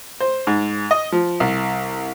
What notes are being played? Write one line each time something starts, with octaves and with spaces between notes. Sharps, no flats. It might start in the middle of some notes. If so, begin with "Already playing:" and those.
C5
G#2
D#5
F3
C2